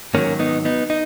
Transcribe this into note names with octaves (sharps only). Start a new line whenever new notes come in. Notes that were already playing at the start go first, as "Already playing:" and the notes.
G#2 D#3 F#3 A#3 C#4
B3 D#4
B3 D#4
D#4